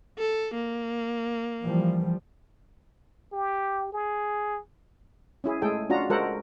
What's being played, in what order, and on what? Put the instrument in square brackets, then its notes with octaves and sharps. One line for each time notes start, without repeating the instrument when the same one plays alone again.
[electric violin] A4
A#3
[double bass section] E3 F3 G3
[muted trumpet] G4
G#4
[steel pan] C#4 E4 G#4
G#3 A3 G#4 A4 G5
C#4 D4 F4 F#4 A#5
G#3 F#4 A4 A#4 C5 F#5